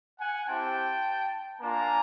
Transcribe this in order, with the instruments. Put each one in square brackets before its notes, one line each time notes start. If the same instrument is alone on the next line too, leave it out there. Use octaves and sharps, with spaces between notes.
[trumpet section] F#5 G#5
C4 E4 G4 G5 A5
A#3 D4 F4 G#5 A#5